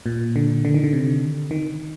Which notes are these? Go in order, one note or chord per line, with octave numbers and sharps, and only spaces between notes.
A#2
D3
D3
D#3
D3
C3
D#3